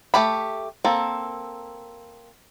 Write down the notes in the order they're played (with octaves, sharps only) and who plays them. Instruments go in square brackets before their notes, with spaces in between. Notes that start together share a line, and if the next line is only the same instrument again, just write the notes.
[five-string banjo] A3 G4 B5
A#3 C4 A4